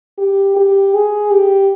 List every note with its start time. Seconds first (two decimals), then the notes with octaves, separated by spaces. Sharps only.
0.18 G4
0.56 G4
0.94 G#4
1.31 G4